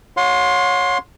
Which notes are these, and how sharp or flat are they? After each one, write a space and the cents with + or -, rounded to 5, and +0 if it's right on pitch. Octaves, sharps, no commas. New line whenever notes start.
C#5 +0 F#5 -45 C6 +10